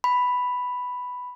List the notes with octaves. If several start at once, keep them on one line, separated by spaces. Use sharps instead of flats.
B5